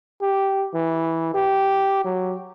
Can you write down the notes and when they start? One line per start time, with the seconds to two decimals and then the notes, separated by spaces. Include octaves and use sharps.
0.22 G4
0.74 E3
1.35 G4
2.05 F#3